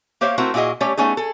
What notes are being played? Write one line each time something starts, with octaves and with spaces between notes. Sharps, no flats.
A#3 G4 C5 C#5 E5 F5
A3 C4 E4 F#4 A#4 C5
A#2 E4 F#4 G#4 D#5
G3 A3 C#4 G4 C#5
A3 B3 C#4 D#4 G#4
G#4 A4